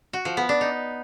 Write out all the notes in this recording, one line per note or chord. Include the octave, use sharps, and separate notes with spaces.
F#4
F3
B3
D4
D#4